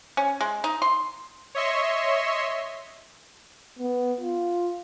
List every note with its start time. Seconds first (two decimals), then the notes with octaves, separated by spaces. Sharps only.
0.17 C#4
0.41 G#3
0.64 D#4
0.82 C6
1.55 C#5 D#5 E5 C6 C#6
3.79 B3
4.21 F4